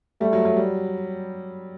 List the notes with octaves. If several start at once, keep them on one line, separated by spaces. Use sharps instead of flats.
G3 A3
F#3
F#3
G3